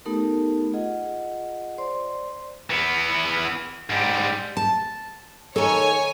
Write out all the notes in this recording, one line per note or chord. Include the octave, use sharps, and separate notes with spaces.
A3 B3 D#4 G4 A4 A#4
F4 G#4 D#5 F#5
C5 D5 C6
E3 B3
G#2 G3
A5
D#3 A4 C#5 G#5